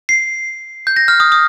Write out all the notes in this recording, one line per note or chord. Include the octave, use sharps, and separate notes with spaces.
C7
G6
A#6
F6
D#6
D#6